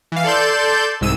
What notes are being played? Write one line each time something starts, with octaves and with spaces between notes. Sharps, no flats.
E3 F5
A4 D5 C6 G6
C2 G#2 E6 D#7